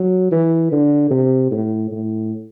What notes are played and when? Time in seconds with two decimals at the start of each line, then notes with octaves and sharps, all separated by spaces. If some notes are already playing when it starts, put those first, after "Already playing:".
Already playing: F#3
0.32 E3
0.72 D3
1.11 C3
1.52 A2
1.91 A2